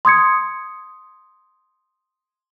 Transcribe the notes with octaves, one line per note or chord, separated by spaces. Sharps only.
C6 D#6 G#6 C#7